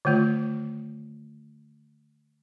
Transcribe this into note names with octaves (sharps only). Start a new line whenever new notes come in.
D3 D#3 A3 F4